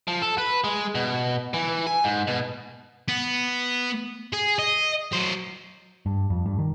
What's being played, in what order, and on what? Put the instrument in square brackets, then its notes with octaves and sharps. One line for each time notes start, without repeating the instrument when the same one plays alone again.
[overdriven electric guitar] F3
A4
B4
G#3
B2
E3
G#5
G#2
B2
[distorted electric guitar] B3
G#4
D#5
F#3 C5
[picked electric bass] G2
F2
G2
D#3